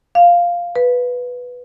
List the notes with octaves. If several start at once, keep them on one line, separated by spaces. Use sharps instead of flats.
F5
B4